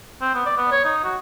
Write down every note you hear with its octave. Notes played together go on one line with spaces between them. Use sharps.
C4
B3
D5
B3
C#5
D#4
F#4